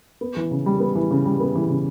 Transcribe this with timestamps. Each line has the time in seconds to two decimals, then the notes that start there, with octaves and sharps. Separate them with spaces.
0.21 B3
0.36 E3
0.51 C#3
0.66 G3
0.80 B3
0.95 E3
1.11 C#3
1.25 G3
1.40 B3
1.55 E3
1.69 C#3